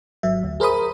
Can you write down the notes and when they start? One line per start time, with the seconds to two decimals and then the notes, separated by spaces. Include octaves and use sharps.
0.23 G#1 F#3 E5
0.43 D2
0.60 G#4 A#4 C5 B5 D#6